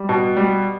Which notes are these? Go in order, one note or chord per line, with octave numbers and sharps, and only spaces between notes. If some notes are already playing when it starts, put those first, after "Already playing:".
Already playing: G3
B2
G3